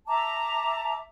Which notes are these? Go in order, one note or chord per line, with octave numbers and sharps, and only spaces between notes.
E5 A5 A#5 D6